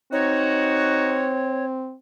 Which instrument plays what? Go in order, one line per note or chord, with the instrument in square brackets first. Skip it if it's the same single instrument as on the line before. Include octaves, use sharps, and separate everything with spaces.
[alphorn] C4 [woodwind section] D#4 F#4 [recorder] C#5